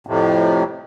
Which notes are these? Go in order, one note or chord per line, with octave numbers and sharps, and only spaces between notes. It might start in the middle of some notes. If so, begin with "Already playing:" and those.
F2 A2 C3